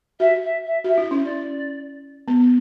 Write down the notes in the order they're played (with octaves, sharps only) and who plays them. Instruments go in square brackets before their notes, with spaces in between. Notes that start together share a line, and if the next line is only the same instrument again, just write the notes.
[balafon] F#4 [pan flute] E5
[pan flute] E5
E5
[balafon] F#4 [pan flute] E5
[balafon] E4
C#4
[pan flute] D5
[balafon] B3